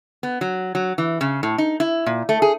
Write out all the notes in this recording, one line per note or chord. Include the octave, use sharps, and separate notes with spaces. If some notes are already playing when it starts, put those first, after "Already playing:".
B3
F#3
F#3
E3
C#3
A2
D#4
E4
A#2
A3
G#4